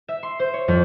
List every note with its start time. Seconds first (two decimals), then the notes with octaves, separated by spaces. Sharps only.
0.08 E5
0.23 C6
0.39 C5
0.54 C#5
0.68 F2